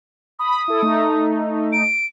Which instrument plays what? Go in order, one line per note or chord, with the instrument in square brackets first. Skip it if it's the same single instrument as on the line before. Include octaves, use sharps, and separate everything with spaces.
[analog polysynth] B5 [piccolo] D#6
[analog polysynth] E4 A4
A3 D#4
[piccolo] D7